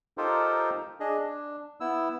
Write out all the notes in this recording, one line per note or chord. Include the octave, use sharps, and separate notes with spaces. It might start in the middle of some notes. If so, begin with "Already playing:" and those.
D#4 F4 G4 A4 A#4 C5
D4 G#4 D#5
D4
B3 E4 E6